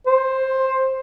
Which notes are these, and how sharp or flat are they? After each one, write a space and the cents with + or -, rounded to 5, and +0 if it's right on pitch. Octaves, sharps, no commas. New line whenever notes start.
C5 +10